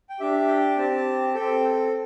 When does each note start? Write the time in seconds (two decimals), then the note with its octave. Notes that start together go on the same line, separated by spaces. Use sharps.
0.10 G5
0.20 D4 G4 E5
0.48 G5
0.77 C4 G4 A5
1.34 C4 A4 G5